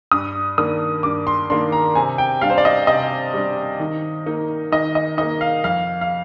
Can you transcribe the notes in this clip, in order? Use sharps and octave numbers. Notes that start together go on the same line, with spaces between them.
G2 D#6
D#3 A#3 D4 D#6
G2 D6
C6
D#3 A#3 D4 C6
A#5
C3 G#5
G5
G3 D4 F5
C5
D5
D#5
C3 D#5
G3 D4
D#3
A#3 D#4
D#3 D#5
D#5
A#3 D#4 D#5
F5
F2 F5
F5